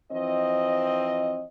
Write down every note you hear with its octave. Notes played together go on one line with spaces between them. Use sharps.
E3 F3 C4 D#5